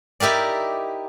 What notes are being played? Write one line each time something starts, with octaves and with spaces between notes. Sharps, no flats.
D#4 E4 G4 A#4 D5